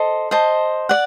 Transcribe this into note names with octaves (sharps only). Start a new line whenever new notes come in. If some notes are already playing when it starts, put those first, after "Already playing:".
Already playing: A4 C5 D#5 A5
C5 D#5 A5
D5 F#5